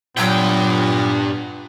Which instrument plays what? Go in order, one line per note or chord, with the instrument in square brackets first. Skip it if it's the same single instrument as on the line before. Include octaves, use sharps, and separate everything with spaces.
[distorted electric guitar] G2 G5 [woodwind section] A#2 [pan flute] F#3 [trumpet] B3